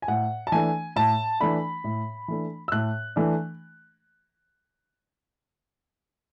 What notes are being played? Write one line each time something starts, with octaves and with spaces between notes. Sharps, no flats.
G#5
A2 F#5
A5
E3 A3 D4 G#5
A2 A5
E3 A3 D4 B5
A2
E3 A3 D4
E6
A2 F#6
E3 A3 D4